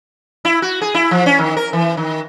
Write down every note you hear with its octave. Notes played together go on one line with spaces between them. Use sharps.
E4
F#4
G#4
E4
F3
C#4
D#3
A#4
E3
D#3